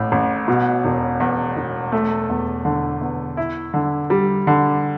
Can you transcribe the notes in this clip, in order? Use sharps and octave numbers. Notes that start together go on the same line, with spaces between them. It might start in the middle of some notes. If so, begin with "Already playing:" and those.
Already playing: A1 A2
A1
B2
E1
E2
E1
A3
E2
D3
E2
E4
D3
G3
D3